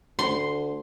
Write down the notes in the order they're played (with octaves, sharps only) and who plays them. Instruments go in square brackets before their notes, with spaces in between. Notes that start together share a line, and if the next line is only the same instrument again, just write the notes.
[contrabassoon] D2 [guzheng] C6